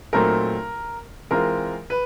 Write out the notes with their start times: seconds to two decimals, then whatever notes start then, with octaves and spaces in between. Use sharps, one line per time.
0.13 A#2 F#3 A3 C4 D#4 A#4
1.31 E3 G#3 C4 F4 A#4
1.90 B4